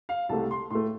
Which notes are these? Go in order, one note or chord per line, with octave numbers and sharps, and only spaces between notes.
F5
C2 C3 A3 A5
C6
A2 A3 C6